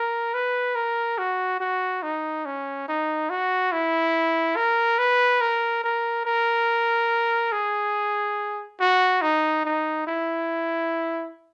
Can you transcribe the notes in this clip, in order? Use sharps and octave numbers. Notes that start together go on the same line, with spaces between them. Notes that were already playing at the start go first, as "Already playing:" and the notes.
Already playing: A#4
B4
A#4
F#4
F#4
D#4
C#4
D#4
F#4
E4
A#4
B4
A#4
A#4
A#4
G#4
F#4
D#4
D#4
E4